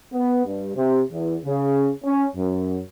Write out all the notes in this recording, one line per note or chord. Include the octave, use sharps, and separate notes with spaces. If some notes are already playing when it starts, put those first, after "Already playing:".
B3
G2
C3
E2
C#3
C#4
F#2